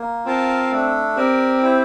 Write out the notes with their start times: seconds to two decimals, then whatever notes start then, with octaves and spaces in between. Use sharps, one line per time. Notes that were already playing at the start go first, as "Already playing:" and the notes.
Already playing: A#3
0.25 C4 F4 A#4 F5 A5
0.71 A3 D4 A4
1.16 C4 G4 A#4 D5
1.61 E4 G4 C5